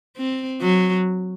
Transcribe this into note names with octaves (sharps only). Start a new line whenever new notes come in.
C4
F#3